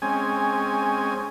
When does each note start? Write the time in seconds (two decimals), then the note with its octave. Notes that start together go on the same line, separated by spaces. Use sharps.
0.02 G#3 C4 C#4 G#5